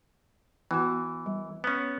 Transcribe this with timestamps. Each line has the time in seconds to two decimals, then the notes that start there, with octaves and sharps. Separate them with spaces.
0.71 E3 B3 F#4
1.26 G3
1.64 B3 C#4